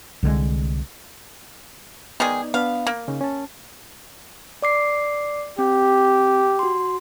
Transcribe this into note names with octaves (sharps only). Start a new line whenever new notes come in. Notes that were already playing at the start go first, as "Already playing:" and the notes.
C2 D3 F#3 G#3
D#3 G#3 B3 D#4 G#4 D5
B3 D4 F5 B5
A#3
C#3 C#4 D#4
C#4 A5
D5 D6 C7
C4 G4
F#4 C6